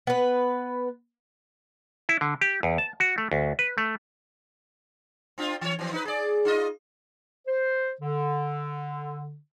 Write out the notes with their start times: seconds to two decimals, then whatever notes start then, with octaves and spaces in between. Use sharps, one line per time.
0.07 B3 B4
2.09 E4
2.21 D3
2.41 G4
2.63 E2
2.78 A5
3.00 F#4
3.18 A3
3.32 D2
3.59 B4
3.78 A3
5.38 C4 D4 F4
5.61 E3 C#5
5.79 E3 F3 C4
5.93 D#4 B4
6.05 G#4 D5
6.45 D#4 F4 D#5
7.47 C5
8.01 D3